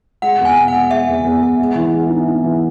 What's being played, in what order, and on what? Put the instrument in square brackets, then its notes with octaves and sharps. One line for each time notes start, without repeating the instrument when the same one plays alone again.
[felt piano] G#3 [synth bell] F#5
[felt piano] E2 [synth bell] G#5
[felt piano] B2
[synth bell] F#5
[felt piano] G#3
[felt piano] G#3 [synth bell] E5
[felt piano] E2
E2
E2
G#3
E3
G#3
D#4
D#4
E3